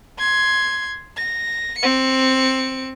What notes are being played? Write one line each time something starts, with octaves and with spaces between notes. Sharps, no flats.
C6 G#6
A#6
C4 C#7